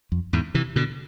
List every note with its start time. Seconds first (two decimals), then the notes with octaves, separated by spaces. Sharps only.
0.12 F2
0.33 E2 G#2
0.54 C3 E3
0.76 B2 D3